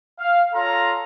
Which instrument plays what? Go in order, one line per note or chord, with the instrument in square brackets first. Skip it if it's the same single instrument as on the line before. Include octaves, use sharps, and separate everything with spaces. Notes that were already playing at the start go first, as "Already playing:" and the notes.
[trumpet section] F5
F4 A4 C#5 F5 A#5 C6